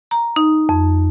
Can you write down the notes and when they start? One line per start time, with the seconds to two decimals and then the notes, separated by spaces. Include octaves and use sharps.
0.11 A#5
0.36 D#4
0.69 F2